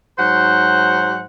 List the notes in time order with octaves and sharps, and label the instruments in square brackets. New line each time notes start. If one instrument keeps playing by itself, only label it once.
[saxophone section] G#2 F#3 C5 F#5